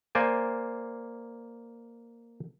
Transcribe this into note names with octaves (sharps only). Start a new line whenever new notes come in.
A#3 C5 D5 G#5